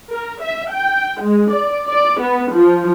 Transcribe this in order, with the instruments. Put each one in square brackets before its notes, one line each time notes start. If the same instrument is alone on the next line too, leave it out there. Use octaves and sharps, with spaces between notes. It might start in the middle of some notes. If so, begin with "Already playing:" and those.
[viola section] A#4
E5
G5
G#3
D5
D5
B3
F3